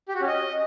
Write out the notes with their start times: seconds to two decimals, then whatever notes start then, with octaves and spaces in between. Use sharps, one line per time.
0.09 G4
0.15 F#4
0.21 C#4
0.28 D#5